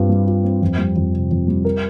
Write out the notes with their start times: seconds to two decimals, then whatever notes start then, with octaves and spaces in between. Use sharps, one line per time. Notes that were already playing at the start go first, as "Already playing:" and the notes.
Already playing: G2 C4 F4
0.09 G3
0.27 F4
0.44 C4
0.62 F2
0.78 G3
0.96 F2
1.13 C3
1.31 F2
1.48 G3
1.65 A#4